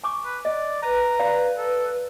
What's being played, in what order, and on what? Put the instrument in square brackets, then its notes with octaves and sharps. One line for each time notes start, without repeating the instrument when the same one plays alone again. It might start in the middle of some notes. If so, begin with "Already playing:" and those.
[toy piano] G#5 C#6 D6
[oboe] B4
[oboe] D5 [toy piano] D#5
[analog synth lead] B4 [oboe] A#5
[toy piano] D5 F5 B5
[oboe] A4